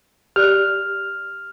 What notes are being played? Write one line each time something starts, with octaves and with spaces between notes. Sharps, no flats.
G4 D5 F6 F#6